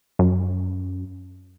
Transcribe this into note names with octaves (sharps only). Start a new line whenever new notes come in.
F#2